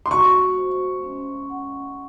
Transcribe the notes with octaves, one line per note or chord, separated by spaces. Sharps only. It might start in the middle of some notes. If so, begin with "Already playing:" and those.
C6
F#4 C#6
C5
C#4
F#5